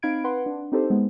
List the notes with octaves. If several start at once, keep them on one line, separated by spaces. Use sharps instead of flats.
C4 D#4 F5 B5 G#6 D7
B4 F#5 C6
D4
C4 D#4 G4 A4 C5
G#3 B3